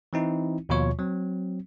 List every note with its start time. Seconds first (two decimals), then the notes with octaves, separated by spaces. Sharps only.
0.13 E3 C4 D#4 E4
0.69 D#2 B2 F3 F4 C#5 C#6
0.99 F#3 C4